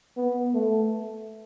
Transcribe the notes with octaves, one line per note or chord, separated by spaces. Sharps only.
B3
A3